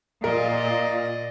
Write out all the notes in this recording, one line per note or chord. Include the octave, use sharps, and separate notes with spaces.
A#2 F4 A#4 D5 D#5